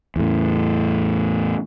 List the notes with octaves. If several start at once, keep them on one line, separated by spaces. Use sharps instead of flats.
E2 A2